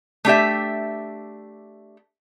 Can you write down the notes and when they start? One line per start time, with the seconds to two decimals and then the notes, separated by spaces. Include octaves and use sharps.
0.25 A3 D4 G4 E5